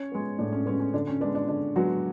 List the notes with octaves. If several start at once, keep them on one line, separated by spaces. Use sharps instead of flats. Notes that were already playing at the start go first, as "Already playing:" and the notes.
Already playing: C#4 C#5
G#3 B3
A2 D4
C#4
G#3 B3 C#4
C#4
D3 D4
C#4
G#3 B3 D4
D4
D3 D4
F#3 G#3 B3 F#4